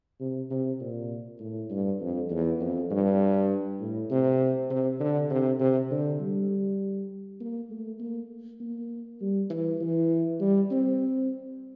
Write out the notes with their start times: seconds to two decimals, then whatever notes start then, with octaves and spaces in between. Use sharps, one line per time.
0.20 C3
0.51 C3
0.80 A#2
1.40 A2
1.70 G2
2.00 F2
2.30 E2
2.60 F2
2.90 G2
3.80 A2
4.10 C3
4.70 C3
5.00 D3
5.30 C3
5.60 C3
5.91 D3
6.20 G3
7.40 A#3
7.71 A3
8.00 A#3
8.60 A#3
9.21 G3
9.50 E3
9.81 E3
10.40 G3
10.71 C4